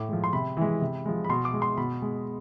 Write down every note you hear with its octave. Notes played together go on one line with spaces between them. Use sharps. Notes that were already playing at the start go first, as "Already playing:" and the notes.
Already playing: A2 D6
F3 G#3
C6
C3 B5
E3 G#3
C3
F3 G#3
B5
B2 C6
D6
G#3
C6
B2 B5
G#3